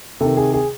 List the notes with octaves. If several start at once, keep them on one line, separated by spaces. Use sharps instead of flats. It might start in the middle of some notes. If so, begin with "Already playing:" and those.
C3 D#3 A4
G#4
G#4